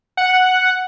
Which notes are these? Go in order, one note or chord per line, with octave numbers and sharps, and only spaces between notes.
F#5